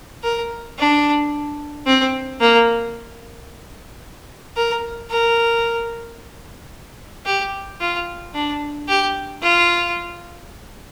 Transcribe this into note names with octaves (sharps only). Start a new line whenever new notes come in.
A#4
D4
C4
A#3
A#4
A#4
G4
F4
D4
G4
F4